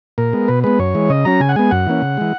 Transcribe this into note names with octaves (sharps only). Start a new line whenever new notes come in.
A#2 A#4
G#3 B3
B2 B4
G#3 B3 B4
F#2 C#5
E3 G#3
C#3 D#5
F#3 C#4 A#5
C#3 G#5
F#5
G#3 B3 G#5
F#2 F#5
E3 A#3 C#4
C#3
E3 G#3